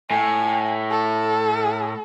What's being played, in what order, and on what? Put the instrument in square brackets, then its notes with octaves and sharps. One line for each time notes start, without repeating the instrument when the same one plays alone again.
[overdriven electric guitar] A2 [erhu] G#5
[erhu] A4